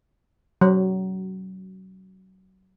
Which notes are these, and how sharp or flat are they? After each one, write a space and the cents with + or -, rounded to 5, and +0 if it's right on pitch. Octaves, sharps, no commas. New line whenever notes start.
F#3 +30